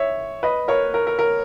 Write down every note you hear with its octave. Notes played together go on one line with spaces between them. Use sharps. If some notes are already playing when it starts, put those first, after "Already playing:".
Already playing: C#5 E5
B4 D#5
A#4 C#5
A#4
A#4
A#4